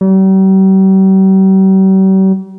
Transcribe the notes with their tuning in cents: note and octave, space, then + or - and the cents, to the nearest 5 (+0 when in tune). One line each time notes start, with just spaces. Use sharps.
G3 -45